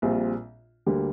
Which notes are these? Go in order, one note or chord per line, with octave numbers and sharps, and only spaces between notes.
A#1 A#2 G3 C4 F4
D2 D3 G3 A#3 G4